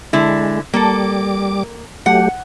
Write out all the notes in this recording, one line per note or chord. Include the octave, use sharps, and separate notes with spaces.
D3 G#3 E4
G3 A#3 A4 D6
F#3 A3 G4 F#5